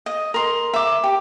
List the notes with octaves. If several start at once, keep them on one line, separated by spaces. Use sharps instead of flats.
D#5
A#4 C6
E5 D6
G4